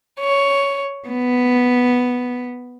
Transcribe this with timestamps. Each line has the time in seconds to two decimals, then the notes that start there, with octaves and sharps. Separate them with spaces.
0.19 C#5
1.08 B3